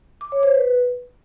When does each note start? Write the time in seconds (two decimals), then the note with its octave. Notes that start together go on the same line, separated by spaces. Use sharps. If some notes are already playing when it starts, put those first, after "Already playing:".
0.21 D6
0.32 C#5
0.43 C5
0.54 B4